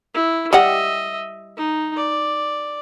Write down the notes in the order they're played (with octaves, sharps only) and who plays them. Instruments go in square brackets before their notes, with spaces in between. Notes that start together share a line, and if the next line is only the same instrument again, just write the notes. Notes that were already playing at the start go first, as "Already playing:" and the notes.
[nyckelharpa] E4
[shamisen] G3 G4 F#5 [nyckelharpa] D#5 E5
[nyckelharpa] D#4
D5